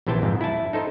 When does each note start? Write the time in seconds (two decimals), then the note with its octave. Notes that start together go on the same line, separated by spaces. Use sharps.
0.07 A#1 C3 E3 C5 G5 A5
0.22 F2 G#2
0.41 E4 A5
0.73 D#4 A4 C5